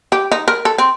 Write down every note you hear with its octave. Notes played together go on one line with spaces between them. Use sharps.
G4
D#4
A#4
A4
C4